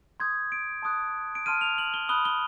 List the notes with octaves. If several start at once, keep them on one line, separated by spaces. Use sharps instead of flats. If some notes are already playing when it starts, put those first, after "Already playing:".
C6 D#6 G6 G#6
D7
A5 C6 D#6 F#6
D7
A5 C6 F6 D#7
F7
F#7
G7
B5 D#6 F#6 G7
G7